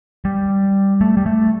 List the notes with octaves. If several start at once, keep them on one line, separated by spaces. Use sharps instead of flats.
G3
A3
G3
A3